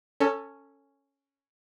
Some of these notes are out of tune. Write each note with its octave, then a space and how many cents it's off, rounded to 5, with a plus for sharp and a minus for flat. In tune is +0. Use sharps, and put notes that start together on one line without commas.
C#4 +0 A4 +20